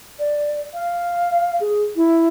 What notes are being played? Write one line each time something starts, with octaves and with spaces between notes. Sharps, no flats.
D5
F5
G#4
E4